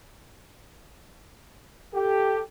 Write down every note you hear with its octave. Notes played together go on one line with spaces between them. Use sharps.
G4 A4